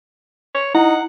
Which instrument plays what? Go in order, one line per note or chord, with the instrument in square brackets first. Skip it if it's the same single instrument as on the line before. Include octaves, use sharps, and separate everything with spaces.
[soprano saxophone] C#5
[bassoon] D#4 [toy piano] E4 [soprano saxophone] F#5